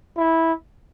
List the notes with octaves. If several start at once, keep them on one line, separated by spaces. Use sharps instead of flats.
E4